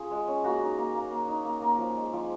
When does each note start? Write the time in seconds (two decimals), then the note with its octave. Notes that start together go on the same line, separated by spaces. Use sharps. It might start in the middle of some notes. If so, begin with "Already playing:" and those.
Already playing: C#4 F4 G#4
0.11 G#3
0.27 C#4
0.44 A#3 F#4
0.61 D#4
0.78 A#3
0.94 A#3
1.11 A#3
1.28 D#4
1.45 A#3
1.61 A#3
1.78 F3
1.96 G#3
2.13 F3